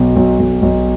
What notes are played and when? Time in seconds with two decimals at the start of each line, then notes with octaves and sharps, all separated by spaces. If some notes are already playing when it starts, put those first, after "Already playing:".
Already playing: B1 B2
0.16 B1
0.39 B1
0.62 B1